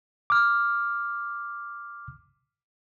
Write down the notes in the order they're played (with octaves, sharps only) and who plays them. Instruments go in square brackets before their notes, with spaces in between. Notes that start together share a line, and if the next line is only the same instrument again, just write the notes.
[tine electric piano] D6 F6